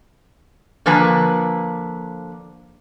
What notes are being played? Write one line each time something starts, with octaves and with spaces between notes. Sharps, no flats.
D3 F3 A#3 B4 G#5 A#5